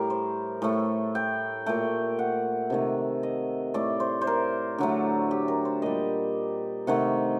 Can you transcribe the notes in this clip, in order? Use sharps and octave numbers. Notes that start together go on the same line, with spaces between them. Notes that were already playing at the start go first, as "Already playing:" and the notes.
Already playing: A2 G3 G4 A#4
C5
A2 A3
G5
A#2 A3 G5
F#5
C3 D#3 A3
D#5
A2 A3 D5
C5
C5
A#4
D3 F#3 A3
G4
A#4
C5
A#2 G3 D#5
C3 D#3 A3 F#5